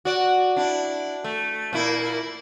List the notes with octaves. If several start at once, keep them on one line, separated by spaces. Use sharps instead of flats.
F#4 D5
D4 E4
A3
A#2 A#3 E4